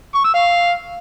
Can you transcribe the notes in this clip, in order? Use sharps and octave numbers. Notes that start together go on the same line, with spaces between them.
C#6
E6
F5